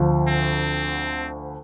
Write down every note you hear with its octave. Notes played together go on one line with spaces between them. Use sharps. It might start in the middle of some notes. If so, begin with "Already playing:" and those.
Already playing: D2 D3 F3
C4